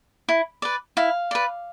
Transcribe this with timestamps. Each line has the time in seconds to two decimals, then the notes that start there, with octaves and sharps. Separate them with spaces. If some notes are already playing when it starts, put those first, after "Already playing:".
0.29 E4
0.62 B4 D5
0.97 E4 F5
1.31 B4 D5